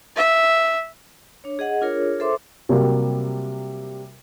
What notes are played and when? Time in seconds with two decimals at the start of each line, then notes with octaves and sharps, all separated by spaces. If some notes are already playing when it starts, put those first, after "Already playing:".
0.16 E5
1.44 D4 C#5
1.59 G#4 D#5 F#5
1.81 D4 F4 G#4 A#4 C#5
2.20 A4 C5 E5 C6 D6
2.69 C3 F#3 G3 A#3